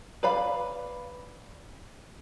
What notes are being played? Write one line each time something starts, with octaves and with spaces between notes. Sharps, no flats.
B4 D5 F5 B5